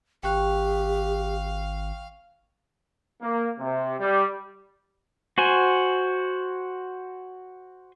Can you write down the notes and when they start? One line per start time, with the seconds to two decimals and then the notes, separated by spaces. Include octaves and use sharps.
0.23 G#1 G4 F5 G5 C#6 F#6
3.21 A#3
3.59 C3
3.99 G3
5.38 F#4 C5 G#5